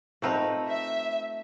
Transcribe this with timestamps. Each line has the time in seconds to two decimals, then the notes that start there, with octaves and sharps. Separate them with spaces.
0.22 F3 A3 C4 D#4 B4 F5
0.68 E5